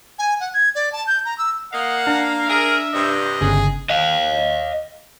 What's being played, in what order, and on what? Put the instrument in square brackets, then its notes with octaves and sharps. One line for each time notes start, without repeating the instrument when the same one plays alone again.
[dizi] G#5
F#5
G#6
D5
A5
G6
A#5
E6
[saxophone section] A#3 A#4 F5 [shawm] D#5 [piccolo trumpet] F#5
[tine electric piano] D4 [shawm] A#5
[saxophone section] G#4 A#4 [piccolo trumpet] E5
[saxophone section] G2 C3 [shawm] D#5
[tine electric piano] G1 C#3 [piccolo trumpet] G#4
[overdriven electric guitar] D#5 F5